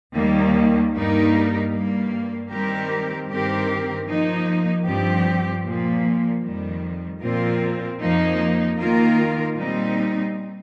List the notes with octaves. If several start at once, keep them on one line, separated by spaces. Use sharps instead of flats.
D#2 D#3 G3 A#3
G2 G3 A#3 D#4 A#4
G2 G3 A#3
D#3 G3 C4 G4 A#4
G2 D#3 C4 G4 A#4
F3 A#3 D#4
G2 F3 C4 G4
A#2 F3 A#3
F2 D#3 G3
A#2 F3 C4 F4 A#4
F2 F3 A#3 D#4
D#3 A#3 F4 A#4
A#2 G3 C4 D#4